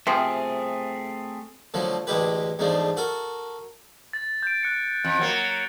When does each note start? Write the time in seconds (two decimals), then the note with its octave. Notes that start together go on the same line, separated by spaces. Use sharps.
0.07 C3 F3 A3 C4 G#4
1.74 A2 D3 F3 F#3
2.07 A1 D2 G#3 E4 G4 B4
2.59 E2 G#2 F3 A3 D4
2.97 F#4 A4 A#4
4.13 A6
4.43 G6 D7
4.63 F#6 C#7
5.04 F2
5.19 F#3 A#3